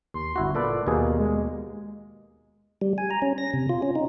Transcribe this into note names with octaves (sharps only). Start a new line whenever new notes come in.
D#2 C6
G1 E4 F#4
A#2 A4 B4 D5
D#2 B2 A#3 G#4
G#3
G3
G#5
A#5
C#4
A#6
C3
F4
C#4
D#4